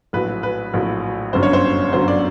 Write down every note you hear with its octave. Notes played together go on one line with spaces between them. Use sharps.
A#1 A2 F#3 B4
B4
A#1 A2 F#3
G1 F#2 D3 F#3 C5
C#5
C5
G1 F#2 D3 F#3 C5
D5